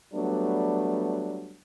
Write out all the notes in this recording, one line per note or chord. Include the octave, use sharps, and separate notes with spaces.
F#3 G3 A3 B3 D4